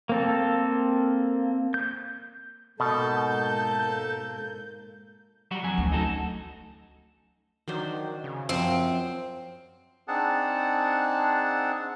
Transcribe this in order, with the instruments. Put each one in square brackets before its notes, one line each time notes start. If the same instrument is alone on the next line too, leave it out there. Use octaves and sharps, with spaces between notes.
[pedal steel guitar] A#3 C4 A4
G6
[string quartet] G#2 A#3 G6 [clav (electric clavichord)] B2 [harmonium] A4 A5
[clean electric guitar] F#3 G3 F#4
F2 F#3 G#5
[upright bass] D2 C#4
[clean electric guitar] D#4 F#4 A4
[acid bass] D#3 [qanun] F#3 D4 C5
[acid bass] C#3
[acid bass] F#2 [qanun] F3 [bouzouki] C4
[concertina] C4 D4 D#4 G#4 F#5 A5